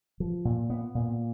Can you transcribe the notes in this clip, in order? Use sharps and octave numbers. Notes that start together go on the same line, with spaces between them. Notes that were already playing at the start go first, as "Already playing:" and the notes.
F3
A#2
B3
A#2